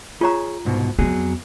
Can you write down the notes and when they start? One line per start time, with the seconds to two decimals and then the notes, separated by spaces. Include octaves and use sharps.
0.21 F4 G#4 C#5 A#5
0.65 C2 G#2 B2
0.99 F2 F#3 B3 G#4